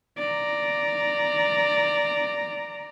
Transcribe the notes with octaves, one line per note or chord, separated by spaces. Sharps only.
D5 A#5